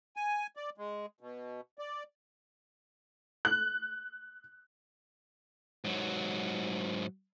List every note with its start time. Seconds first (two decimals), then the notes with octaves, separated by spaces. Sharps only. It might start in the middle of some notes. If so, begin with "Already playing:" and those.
0.16 G#5
0.56 D5
0.77 G#3
1.21 B2
1.79 D5
3.45 F#6
5.84 G#2 F#3